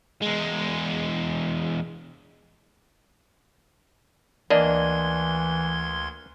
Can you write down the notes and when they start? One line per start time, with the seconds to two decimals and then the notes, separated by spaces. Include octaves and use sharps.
0.22 E2 G#3
4.50 D2 E3 A#3 D4 D5 D#5 C6 G#6